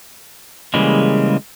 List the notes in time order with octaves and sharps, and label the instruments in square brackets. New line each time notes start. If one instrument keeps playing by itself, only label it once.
[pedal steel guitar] C#3 E3 G3 G#3 A#3